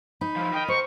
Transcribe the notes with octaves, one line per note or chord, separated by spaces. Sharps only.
D#4 B5
F3 E4
A#4 D#5 G5
C5 C#6